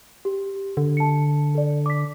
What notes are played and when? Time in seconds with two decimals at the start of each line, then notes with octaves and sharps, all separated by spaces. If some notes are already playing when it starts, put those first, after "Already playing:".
0.25 G4
0.77 D3
0.97 A5 C#7
1.55 A4 D5
1.86 D6 B6